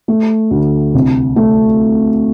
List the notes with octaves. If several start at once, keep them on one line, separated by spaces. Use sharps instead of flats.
A3
D2
C2
A3